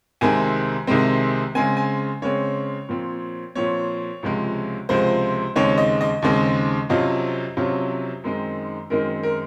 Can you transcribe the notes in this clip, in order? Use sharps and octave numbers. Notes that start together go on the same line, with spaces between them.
C2 C3 D#3 G#3 C4 G#5
C2 C3 D#3 G#3 C4
C#3 G#3 C4 G#5
G#5
C#3 G#3 C4 C#5
A#2 F3 C4
A#2 F3 C4 C#5
C#2 C3 F3 G#3
C#2 C3 F3 G#3 C5
D#2 C#3 G#3 C4 D#4 C#5
D#5
D#5
D#2 C#3 G#3 C4 D#4
F2 C3 F#3 C#4 F4 D#5
F2 C3 F#3 C#4 F4
F#2 D#3 G#3 C4 D#4
F#2 D#3 G#3 C4 D#4 A#4
A#4